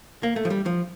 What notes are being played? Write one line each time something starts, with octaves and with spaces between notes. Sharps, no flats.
A#3
A3
F3
G3
F3